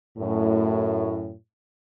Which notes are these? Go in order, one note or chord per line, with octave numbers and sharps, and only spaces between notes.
F#2 A2